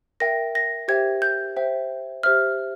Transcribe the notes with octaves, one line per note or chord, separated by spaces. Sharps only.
A#4 E5 G5 A#6
A#6
G4 C5 E5 G5 G#6
G6
C5 E5 G5
G4 C5 E5 F6